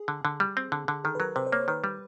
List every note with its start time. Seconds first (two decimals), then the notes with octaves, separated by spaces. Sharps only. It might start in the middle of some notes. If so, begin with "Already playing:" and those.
Already playing: G#4
0.08 D3
0.25 D3
0.40 G3
0.57 C4
0.72 D3
0.88 D3
1.04 D#3 A4
1.15 B4
1.20 F#3 A#4
1.36 C3 C5
1.47 C5
1.52 A#3 C#5
1.68 D#3 B4
1.84 G3